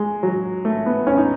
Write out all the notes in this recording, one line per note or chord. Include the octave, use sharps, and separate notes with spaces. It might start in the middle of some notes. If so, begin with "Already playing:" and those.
Already playing: G#3
F#3
A3
B3
C#4
D#4